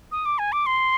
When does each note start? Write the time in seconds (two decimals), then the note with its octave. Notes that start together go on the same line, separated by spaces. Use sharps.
0.12 D#6
0.26 D6
0.39 G#5
0.52 D6
0.66 C6